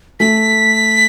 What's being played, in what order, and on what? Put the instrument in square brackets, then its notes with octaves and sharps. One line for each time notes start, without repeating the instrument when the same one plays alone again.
[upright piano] A3 [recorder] B6